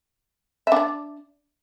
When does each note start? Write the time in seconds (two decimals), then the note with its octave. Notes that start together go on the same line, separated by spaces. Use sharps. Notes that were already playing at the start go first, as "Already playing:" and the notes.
0.67 E5
0.72 D4
0.76 D5